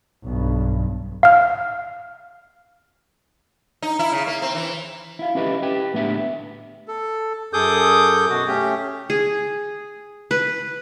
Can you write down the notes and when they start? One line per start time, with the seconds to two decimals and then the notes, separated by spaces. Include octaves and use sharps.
0.24 B1 G2
1.23 F5 F6
3.82 D#4
3.99 E4
4.12 C#3
4.27 A#3
4.42 C4
4.55 E3
5.19 E4 F5
5.35 C#4 E4 G4 B4 C5 D#5
5.62 G4 B4 G5
5.94 A2 B3 D4 G4 E5
6.88 A4
7.53 F#2 G#4 A4 D6 D#6 G6
8.30 B2 F#4
8.47 A3 C#4 G4
9.10 G#4
10.31 B4